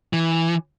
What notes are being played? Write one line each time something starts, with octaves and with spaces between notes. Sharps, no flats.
E3